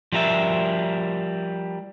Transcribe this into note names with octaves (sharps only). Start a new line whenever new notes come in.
F3 G3 A#4 E5